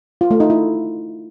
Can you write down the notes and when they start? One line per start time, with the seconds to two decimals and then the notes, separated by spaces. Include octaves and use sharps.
0.21 F4
0.31 A3
0.40 D#4
0.50 E4